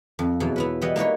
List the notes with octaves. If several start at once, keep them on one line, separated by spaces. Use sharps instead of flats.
F2
E2 B2 F#3
B3 E4 B4
E3 G3 D#5 F#5
A#3 D#4 B4 C#5